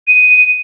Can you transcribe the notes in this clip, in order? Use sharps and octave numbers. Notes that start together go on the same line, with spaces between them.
D#7